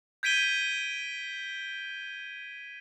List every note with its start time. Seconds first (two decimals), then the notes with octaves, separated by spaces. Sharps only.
0.23 G6 G#6 B6 D7 D#7 G7